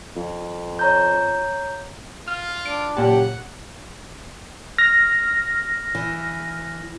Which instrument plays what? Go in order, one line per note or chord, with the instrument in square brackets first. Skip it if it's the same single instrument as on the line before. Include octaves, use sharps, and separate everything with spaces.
[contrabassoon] F2
[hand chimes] C#5 A#5 G6
[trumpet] F4 [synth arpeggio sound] F6
[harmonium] D4 D5 [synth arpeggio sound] D7
[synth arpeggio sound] A#2 A5 [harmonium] C#3 F#3 [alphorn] G4 [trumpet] F#5
[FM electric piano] F6 A#6
[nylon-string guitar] E3